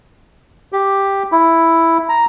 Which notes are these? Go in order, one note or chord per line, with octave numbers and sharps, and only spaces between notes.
G4
E4
A#5